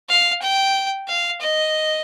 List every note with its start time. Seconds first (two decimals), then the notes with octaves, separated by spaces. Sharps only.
0.09 F5
0.42 G5
1.07 F5
1.40 D#5